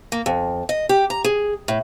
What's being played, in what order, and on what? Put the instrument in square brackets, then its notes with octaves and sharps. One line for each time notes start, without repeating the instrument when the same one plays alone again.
[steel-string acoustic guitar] A#3
F2
D#5
G4
A#5
G#4
A2